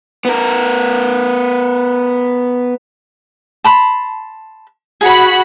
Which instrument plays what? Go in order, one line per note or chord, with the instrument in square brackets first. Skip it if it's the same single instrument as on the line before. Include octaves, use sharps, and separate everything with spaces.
[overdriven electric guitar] B3 A#4
[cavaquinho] A5 B5 C6
[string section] F#4 B5 [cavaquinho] G#4